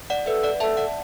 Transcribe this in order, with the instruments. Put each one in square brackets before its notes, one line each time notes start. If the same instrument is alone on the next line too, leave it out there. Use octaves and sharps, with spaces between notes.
[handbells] D5 F#5
[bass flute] A4 [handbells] B4 E5
[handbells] D5 F#5
[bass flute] A4 [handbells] E5 A5
[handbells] D5 F#5